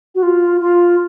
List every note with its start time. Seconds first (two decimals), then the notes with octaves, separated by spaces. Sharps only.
0.15 F#4
0.23 F4
0.61 F4